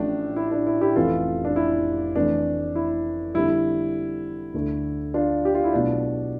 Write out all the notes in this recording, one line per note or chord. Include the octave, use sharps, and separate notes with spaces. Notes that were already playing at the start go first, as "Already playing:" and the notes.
Already playing: A1 A2 F3 A3 D4
E4
D4
E4
E4 G4
F1 F2 C3 E3 F4 A4
D4
E4
F2 C3 E3 A3 D4
E4
F2 D3 G3 E4
D2 D3 A3
D4 F4
G4
F4
E4
B1 B2 A3 D4